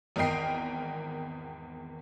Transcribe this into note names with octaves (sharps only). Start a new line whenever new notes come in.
G#1 E2 A#4 D#5 G5 C7